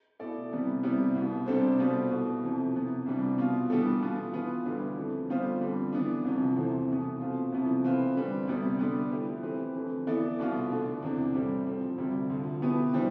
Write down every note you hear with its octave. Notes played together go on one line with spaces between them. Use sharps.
B2 A3 E4 A4 D5
C3 E3 G3 B3
C3 G3 B3 E4 G4
C2 B2 B3
C3 G3 D4 A4 C5
B2 G3 B3 F4 C5
C2 B2 A3
F2 C3 E3
C3 E3 B3
C2 C3 G3 D4
B2 B3 F4
E3 G3 B3 D4 A4
B2 B3 F4
E3 B3 F4 B4
D2 D3 G3 D4 F4
F2 E3 A3
D3 G3 B3 F4 C5
F2 D3 G3
E3 B3 D4
C2 C3 F3
E2 C3 E3 A3 C4
C2 B2 B3
B2 A3 C4 F4
C2 C3 F3 B3 E4
E3 A3 C4 F4 B4
D3 G3 C4
D2 C3 G3 B3
D3 G3 B3 D4
F3 A3 E4 G4 B4
E3 A3 C4 G4 B4
F2 D3 A3
E3 B3 E4 A4 D5
C2 B2 B3 F4
D3 A3 D4
E2 C3 E3 A3 D4
A2 G3 C4 G4
F3 A3 C4
D2 C3 G3
D2 D3 F3
B2 B3 E4 G4 B4
E3 G3 D4 G4 C5